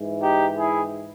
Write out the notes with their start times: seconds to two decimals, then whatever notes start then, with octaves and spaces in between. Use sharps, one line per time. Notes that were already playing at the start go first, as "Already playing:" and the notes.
Already playing: G#2 E3
0.22 D#4 G4
0.58 E4 G#4